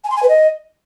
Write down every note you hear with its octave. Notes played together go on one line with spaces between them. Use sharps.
G#5
C6
G#5
B4
D#5